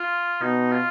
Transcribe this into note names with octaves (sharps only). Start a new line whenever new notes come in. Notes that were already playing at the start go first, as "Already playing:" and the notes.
Already playing: F4
B2 D#4
F4